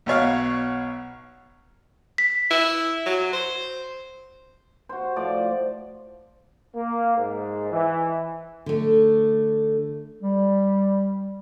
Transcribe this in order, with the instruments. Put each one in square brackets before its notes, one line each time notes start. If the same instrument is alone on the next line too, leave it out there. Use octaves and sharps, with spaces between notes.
[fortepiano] B1 B2 C#5 F5
[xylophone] B6
[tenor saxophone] E4
F#3
C5
[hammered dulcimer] F#4 C5
A2 F3 D5 D6
[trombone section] A#3
G#2
E3
[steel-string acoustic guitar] D3 A3
[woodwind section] G3